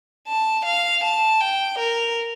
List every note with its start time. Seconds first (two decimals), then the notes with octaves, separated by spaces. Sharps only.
0.28 A5
0.66 F5
1.04 A5
1.41 G5
1.79 A#4